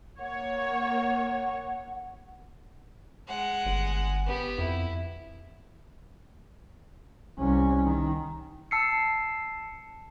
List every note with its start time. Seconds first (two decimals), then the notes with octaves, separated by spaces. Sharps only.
0.20 A#3 C#5 F#5
3.28 G#3 F#5
3.66 G1
4.27 B3 G4
4.59 F2 E4
7.39 C2 C#4
7.85 D#3
8.71 A5 E6 C7 C#7